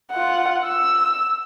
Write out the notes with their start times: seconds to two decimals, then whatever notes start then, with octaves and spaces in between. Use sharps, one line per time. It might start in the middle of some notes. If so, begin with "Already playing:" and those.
0.11 F4 F#5
0.65 E6